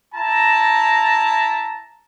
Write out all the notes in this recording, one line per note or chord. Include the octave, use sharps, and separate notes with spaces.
E4 A5 A#5